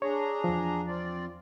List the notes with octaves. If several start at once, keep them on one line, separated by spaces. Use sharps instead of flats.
D4 G#4 C#5 A#5
E2 F3
C4 F4 D5